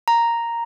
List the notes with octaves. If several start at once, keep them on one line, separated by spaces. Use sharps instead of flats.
A#5